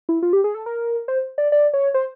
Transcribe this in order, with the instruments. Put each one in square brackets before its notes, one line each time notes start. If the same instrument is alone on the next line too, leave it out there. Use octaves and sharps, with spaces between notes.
[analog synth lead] E4
F4
G4
G#4
A4
A#4
C5
D5
D5
C#5
C5